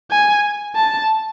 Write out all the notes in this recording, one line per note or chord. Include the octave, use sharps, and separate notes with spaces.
G#5
A5